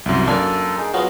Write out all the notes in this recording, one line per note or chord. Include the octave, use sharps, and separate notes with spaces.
C2 F#2
F#2 A#3 D4 A4 G#5
D#4 G#4
F#3 B3 F4 G#4 D#5